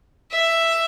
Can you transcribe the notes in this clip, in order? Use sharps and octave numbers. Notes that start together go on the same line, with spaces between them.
E5